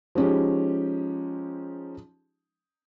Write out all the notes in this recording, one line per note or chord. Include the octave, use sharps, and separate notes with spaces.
F3 G#3 C#4 D#4 G4